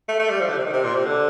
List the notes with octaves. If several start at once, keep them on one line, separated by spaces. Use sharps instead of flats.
A3
A3
G3
F3
D3
C3
D#3
C3
A#2
C3
D3